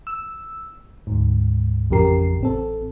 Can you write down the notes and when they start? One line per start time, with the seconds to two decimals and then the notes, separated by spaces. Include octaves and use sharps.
0.07 E6
1.07 D2 G#2
1.90 A1 F2 C#3 G4 A#4 C7
2.41 A1 C4 A4